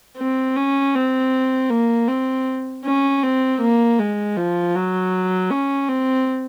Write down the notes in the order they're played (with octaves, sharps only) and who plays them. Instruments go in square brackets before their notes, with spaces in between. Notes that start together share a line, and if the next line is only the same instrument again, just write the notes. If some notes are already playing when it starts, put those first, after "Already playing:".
[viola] C4
C#4
C4
A#3
C4
C#4
C4
A#3
G#3
F3
F#3
C#4
C4